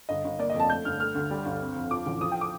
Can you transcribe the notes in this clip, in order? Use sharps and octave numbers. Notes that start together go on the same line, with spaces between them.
G1 D#5
G1
A#3 D5
D#5
F2
A5
A3 G6
G1 F6
A3 F6
D2
G3
G1
C4
F2
F3 D6
A1
F3 D#6
G5
D6